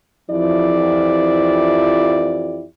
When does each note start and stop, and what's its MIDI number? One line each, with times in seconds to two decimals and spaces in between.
0.30 2.65 41
0.30 2.65 52
0.30 2.65 53
0.30 2.65 64
0.30 2.65 67
0.30 2.65 74